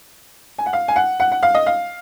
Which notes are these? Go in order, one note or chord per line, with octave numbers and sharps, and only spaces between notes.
G#5
F#5
F5
G#5
F#5
F#5
F#5
F5
D#5
F5